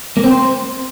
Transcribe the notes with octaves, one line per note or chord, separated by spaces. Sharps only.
A#3
C4
C5